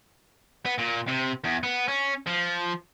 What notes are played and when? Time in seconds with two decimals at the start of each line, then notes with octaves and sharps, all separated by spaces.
0.65 B3
0.78 A#2
1.07 C3
1.44 E2
1.63 B3
1.88 C#4
2.26 F3